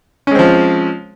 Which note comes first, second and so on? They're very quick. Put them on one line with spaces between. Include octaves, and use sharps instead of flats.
C#4 G#3 C4 F3